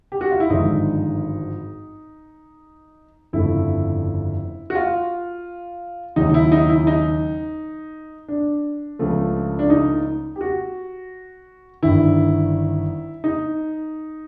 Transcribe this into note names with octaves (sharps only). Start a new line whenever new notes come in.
G4
F#4
F4
E4
G#1 G2 D3 F3 G#3 D#4
G1 F2 C#3 F3 A3 E4
F#4
F4
D#2 C#3 F#3 D#4
D#4
E4
D#4
E4
D#4
D4
C#2 C#3 F3 A3
D4
D#4
G4
F#4
G1 G2 D#3 E4
D#4